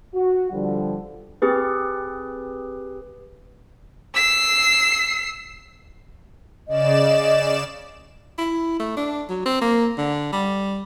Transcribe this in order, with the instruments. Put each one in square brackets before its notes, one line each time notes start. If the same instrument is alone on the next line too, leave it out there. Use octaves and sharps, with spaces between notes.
[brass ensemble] F#4
D3 F3 G3
[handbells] C4 G4 G#4 B4
[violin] E6 C7
[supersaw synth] C#3 D5 E7 [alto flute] D#5
[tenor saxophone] E4
A3
D4
F#3
C4
A#3
D3
G3